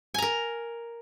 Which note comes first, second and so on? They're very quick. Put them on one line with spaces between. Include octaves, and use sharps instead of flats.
G#5 A#5 A#4